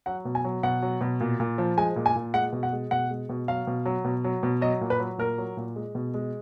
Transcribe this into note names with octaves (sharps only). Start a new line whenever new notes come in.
F#3 F#5
B2
G#5
F#3
B2 F#5
F#3
B2
A#2
A#2
F3
G#3 G#5
A#2
G#5
A#2
G#3 F#5
B2
F#5
G#3
B2 F#5
G#3
B2
F#3 F5
B2
F#3
B2
F#3
B2
F#3 D#5
A#2
B4
F#3
A#2 A#4
F#3
A#2
G#3
B2
G#3